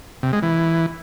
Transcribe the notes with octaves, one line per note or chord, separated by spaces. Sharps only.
C3
G#3
E3